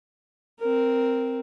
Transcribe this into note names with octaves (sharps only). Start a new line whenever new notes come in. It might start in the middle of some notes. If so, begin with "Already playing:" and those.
C4 A#4